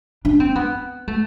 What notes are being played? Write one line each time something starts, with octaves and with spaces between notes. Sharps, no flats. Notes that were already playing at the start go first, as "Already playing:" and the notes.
D4
C4
B3
A3